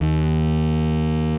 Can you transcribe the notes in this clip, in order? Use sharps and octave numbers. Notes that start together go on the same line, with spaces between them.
D#2